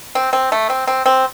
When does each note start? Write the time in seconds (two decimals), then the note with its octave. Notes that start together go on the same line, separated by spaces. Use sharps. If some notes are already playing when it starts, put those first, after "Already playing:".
0.15 C4
0.33 C4
0.52 A3
0.70 C4
0.87 C4
1.06 C4